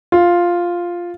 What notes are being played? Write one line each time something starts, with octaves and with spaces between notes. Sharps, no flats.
F4